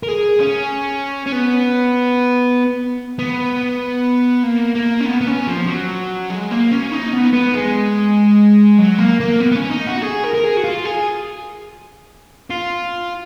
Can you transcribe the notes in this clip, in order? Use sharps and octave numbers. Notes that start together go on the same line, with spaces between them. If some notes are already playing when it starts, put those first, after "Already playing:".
A#4
G#4
C#4
C#4
B3
B3
A#3
A#3
C#4
B3
B3
C#4
F3
F#3
G#3
A#3
C#4
D#4
B3
B3
G#3
F#3
A#3
A#3
B3
B3
C#4
D#4
F#4
G#4
A#4
A#4
G#4
F#4
F4
G#4
F4